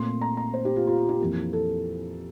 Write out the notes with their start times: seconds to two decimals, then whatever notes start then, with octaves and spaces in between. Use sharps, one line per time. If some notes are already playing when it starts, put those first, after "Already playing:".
Already playing: A#2 A3 C4 C6
0.21 A#5
0.37 A#5
0.54 C5
0.65 G4
0.76 F4
0.87 F4
0.98 F4
1.09 G4
1.20 F2 E3 A#3
1.53 A4